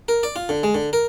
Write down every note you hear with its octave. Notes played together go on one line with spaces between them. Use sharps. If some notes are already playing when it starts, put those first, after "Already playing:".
A#4
D5
F4
D3
G#3
D3
A#4